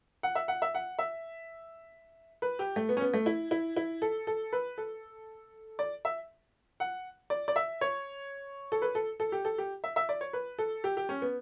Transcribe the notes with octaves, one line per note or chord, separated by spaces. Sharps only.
F#5
E5
F#5
E5
F#5
E5
B4
G4
A3
B3
C#4
B3
A3
E4
E4
E4
A4
A4
B4
A4
D5
E5
F#5
D5
D5
E5
C#5
A4
B4
A4
A4
G4
A4
G4
E5
E5
D5
C#5
B4
A4
G4
G4
C#4
B3